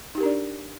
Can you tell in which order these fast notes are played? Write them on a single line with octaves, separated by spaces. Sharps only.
D#4 G4 A#4 D4 D5